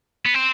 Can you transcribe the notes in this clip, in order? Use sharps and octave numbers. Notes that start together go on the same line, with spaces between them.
B3
C4